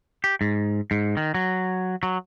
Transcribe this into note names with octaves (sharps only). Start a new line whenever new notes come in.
G4
G#2
G#2
D#3
F#3
F#3